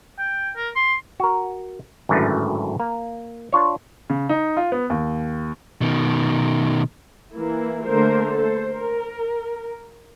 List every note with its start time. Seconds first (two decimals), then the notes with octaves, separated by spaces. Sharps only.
0.18 G5
0.56 A#4
0.75 C6
1.20 F#4 A#4
2.09 G#1 F#2 A2 D3 A3 B4
2.80 A#3
3.53 D4 F4 C#5
4.10 C#3
4.29 D#4
4.57 F4
4.72 B3
4.90 D#2
5.81 B2 D#3
7.33 E3 A#3 E4
7.86 D3 A3 A#3 A#4 C5
8.36 A4 C5
8.73 A#4